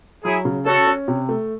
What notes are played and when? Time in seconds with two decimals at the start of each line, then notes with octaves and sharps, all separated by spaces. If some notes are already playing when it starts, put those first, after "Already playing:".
0.24 F#3 E4 G#4
0.45 C#3
0.66 C#4 F#4 A4
0.87 C#4
1.08 C3
1.29 A3